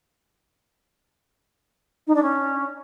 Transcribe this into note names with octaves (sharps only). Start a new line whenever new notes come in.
D#4
D4
C#4